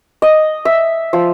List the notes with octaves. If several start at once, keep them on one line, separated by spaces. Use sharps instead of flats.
D#5
E5
F3